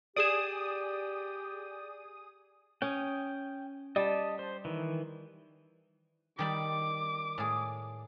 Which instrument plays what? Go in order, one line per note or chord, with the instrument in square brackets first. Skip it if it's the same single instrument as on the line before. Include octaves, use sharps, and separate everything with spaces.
[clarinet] G4 [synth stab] G#4 D#6 [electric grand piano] D5 [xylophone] D7 E7
[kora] C#4 [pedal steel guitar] G5 D#6
[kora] G3 [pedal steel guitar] D#5 A5
[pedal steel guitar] C5
D#3 E3
[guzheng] D#3 G3 B5 [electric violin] D6
[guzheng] A2 G#4